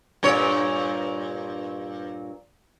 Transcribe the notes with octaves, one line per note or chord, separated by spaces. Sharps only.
G2 A#2 C#5